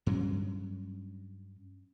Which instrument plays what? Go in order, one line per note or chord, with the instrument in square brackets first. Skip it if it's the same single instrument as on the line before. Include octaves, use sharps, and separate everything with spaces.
[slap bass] G2 F#3 C4 C#4